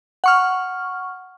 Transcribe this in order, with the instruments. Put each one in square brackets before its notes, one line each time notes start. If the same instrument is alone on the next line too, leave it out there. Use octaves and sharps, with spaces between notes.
[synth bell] F#5 C#6 F6